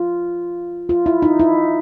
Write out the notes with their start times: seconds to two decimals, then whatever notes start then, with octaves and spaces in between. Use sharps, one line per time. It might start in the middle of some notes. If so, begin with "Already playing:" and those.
Already playing: F4
0.89 F4
1.06 E4
1.22 D#4
1.39 E4